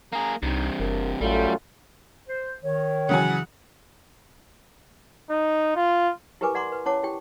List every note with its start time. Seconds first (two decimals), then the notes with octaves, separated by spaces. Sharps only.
0.13 A#3 G#4 A#5
0.43 C2 G2 C3 D#4
0.80 F#1 A#4
1.21 A1 F#2 G3 A3 F4 A4
2.28 C5
2.63 D#3 C#5
3.09 C#3 E3 F#3 F#5 G#5
5.30 D#4
5.76 F4
6.41 E4 G4 A#4 B4 G#5 D6
6.55 D5 F#5 A#5 C6 D6
6.72 B4
6.86 C#4 E4 C#5 F#5 A5 D6
7.03 E4 G4 G5